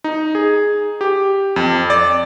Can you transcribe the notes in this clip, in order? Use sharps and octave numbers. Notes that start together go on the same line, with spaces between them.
D#4
G#4
G4
F2
D5